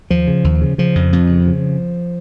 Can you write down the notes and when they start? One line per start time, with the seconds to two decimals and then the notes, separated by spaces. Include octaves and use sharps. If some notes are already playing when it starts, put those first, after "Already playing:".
0.10 D#2 F3
0.28 C#3
0.44 D#2
0.61 C#3
0.78 C#3 F3
0.95 F2
1.13 F2
1.29 C#3
1.46 C#3